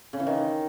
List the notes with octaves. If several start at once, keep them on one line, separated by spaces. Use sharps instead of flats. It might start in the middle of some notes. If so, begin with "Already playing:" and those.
C#3
E3
D#3